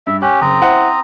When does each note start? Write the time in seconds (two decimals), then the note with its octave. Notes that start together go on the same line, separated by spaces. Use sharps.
0.07 G2 E5
0.22 C#4 G4 F#6
0.42 F#1 C4 A#5 D#6
0.61 E4 C5 F#5